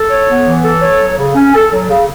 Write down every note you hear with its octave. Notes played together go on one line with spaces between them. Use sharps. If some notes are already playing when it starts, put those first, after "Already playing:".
Already playing: A4
C#5
B3
E3
A4
C#5
F#3
C#3
C#4
A4
F#3
C#3